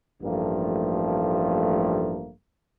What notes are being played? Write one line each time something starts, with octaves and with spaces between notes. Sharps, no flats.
A1 G2 F3 A3 A#3